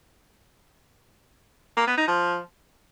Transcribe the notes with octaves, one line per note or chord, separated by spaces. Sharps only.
A#3
B3
D#4
F3